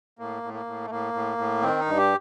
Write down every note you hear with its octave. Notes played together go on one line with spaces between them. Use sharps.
A2 A#3
A2
A#3
A2
A3
A2 A#3
A2
A2
D#3 C4
D#4
G2
G4